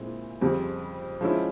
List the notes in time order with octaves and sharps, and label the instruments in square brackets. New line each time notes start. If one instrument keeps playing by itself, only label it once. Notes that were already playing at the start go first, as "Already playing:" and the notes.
Already playing: [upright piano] A#2 G#3 C4 E4 G#4
F2 C#3 G3 C4 G4
F3 G#3 C#4 E4